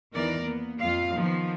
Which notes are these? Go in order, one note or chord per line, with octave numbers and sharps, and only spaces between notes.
E2 D#3 E3 A#4 D5
A#3 B3
F2 F4 F5
D#3 F3 B3